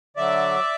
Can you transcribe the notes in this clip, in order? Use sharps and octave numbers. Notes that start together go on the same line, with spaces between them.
D3 F#3 D5 E5